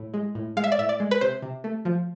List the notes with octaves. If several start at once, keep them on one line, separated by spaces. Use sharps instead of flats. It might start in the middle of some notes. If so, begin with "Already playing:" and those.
Already playing: A2
G#3
A2
G#3 F5
E5
D5
A2 E5
D5
G#3
B4
C3 C5
C3
A3
F3